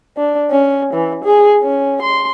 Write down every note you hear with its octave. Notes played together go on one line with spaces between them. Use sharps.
D4
C#4
E3
G#4
C#4
C6